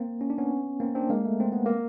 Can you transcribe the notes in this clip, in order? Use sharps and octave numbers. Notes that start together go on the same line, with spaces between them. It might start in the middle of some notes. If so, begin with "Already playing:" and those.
Already playing: A#3 C4
C#4
D4
B3 C#4
A#3 C4
C4 D4
G#3 A#3
A3
C4
B3
A#3